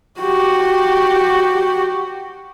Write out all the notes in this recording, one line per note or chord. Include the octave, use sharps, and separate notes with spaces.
F#4 G4